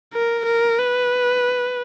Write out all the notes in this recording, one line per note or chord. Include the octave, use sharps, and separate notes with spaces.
A#4
A#4
B4